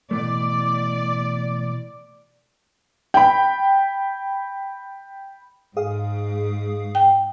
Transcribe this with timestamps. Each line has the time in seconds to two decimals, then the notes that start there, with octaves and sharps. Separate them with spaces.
0.11 B2 E3 A3 D5
3.14 G5 B5
5.77 G#2 G#4 F5 D#6
6.95 G5